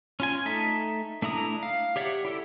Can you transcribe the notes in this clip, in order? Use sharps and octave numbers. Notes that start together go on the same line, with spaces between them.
C#4 F4 G#5
A3 D#4 A4 E5
A3 D4 E4 A#5 D#6
F5
G4 C#5 D5 E5 F#5
E4 G4 A4